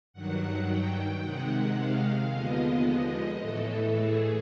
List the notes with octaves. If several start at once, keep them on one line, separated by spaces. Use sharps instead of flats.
G2 D#3 F#3 F#5
G5
C3 D#3 G#3 F#5
F5
D#2 D3 F3 G#3 B3 D#5
D#5
A2 E3 A3 A4
G#4